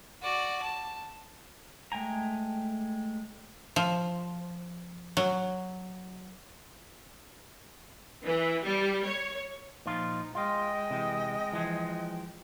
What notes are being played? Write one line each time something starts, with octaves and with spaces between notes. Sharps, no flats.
F#4 D5
A5
G#3 A3 G5 G#5 A#5
F3
F#3
E3
G3
C#5
A#2 F3 D#4 F4
G#3 F4 D#5 G5
C3 E3
E3 F3